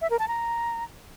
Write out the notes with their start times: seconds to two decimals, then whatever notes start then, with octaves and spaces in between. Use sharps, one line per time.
0.02 E5
0.10 A#4
0.19 A5
0.28 A#5